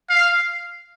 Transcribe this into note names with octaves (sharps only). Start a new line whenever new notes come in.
F5